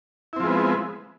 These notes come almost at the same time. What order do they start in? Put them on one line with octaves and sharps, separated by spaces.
E4 C4 F3 G#3 B3